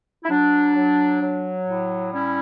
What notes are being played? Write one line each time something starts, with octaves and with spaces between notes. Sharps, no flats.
E4
F#3 D4
F#3
F#3
A2
G3 C#4 E4